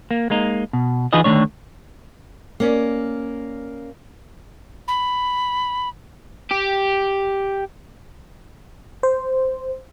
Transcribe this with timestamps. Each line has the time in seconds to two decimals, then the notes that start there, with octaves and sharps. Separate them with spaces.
0.11 A#3
0.30 G#3 A#3 D#4
0.73 B2
1.13 E3 D#4 F4 G#4 B4 D#5
1.24 D3 D#3 A3 D4 C#5
2.60 A#3 C#4 D5
4.88 B5
6.51 G4
9.03 C5